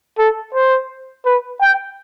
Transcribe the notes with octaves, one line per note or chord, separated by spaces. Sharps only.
A4
C5
B4
G5